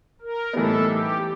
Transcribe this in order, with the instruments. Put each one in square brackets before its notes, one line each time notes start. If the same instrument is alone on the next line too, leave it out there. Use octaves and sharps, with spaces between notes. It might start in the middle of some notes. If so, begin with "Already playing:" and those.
[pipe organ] A#4
[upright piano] A2 E3 G3 B3 D#4 [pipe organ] A4
[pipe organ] G4